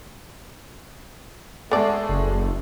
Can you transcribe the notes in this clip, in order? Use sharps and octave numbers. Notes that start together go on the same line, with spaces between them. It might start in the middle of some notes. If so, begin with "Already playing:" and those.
G#3 A3 B3 G#4 A4 D5
F#1